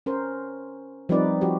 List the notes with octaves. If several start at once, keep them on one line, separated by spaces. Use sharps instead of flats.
C#4 A#4 C5
F3 G3 C4 D#4 B4 D5
F3 F#4 G4